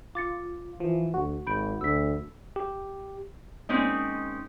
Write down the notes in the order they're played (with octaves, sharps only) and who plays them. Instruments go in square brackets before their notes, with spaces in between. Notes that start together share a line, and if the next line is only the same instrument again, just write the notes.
[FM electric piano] F4 [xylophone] D6 A6 C#7
[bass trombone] E3 [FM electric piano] F3
[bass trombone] D2 [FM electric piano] F#4
[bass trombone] G#1 [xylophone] B5 G6 D7
[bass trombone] D2 [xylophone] E6 B6
[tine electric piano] G4
[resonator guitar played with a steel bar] G#3 A#3 C4 C#4 D#4